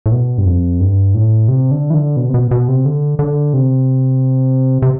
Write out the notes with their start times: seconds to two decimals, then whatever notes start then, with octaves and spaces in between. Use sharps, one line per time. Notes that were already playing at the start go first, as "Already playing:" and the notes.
0.06 A2
0.12 B2
0.38 G2
0.46 F2
0.80 G2
1.15 A2
1.48 C3
1.71 D3
1.90 E3
1.94 D3
2.17 B2
2.29 C3
2.34 B2
2.51 B2
2.68 C3
2.85 D3
3.19 D3
3.54 C3
4.82 C3